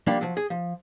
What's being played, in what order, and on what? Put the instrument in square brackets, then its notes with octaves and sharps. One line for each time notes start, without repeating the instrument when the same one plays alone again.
[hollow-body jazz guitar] F3 G3 A#3 D4
F3 F#3
G#4
F3